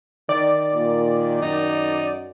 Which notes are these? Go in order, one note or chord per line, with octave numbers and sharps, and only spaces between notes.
D#3 D5
A#2
F#2 D#4